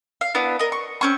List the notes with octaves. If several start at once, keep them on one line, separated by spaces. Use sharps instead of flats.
F5
B3 D4 E4
A#4 D#5
C#6
C4 C#4 C#6